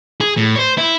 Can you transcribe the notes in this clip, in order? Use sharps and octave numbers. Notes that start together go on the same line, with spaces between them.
G#4
A2
C5 C#5
E4